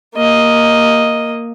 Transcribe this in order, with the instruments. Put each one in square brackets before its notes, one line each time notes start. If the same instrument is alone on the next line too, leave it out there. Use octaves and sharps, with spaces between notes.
[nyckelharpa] A#3 D#5